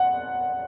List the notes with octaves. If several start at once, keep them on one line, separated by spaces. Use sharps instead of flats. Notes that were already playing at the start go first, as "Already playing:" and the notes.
Already playing: F#5